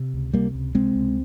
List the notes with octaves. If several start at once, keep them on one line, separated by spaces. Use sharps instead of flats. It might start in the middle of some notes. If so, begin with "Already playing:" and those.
Already playing: C3
C#2
C3 G3 A#3
C#2
C3 G#3 C4
C#2